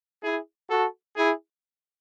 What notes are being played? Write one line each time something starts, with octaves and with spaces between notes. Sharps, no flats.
E4 G#4
F#4 A4
E4 G#4